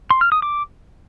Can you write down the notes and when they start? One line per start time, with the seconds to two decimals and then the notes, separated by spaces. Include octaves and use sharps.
0.11 C6
0.21 F6
0.32 D#6
0.42 D6